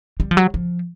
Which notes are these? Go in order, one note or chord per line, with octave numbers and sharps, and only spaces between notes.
G3
F3
F#3
F3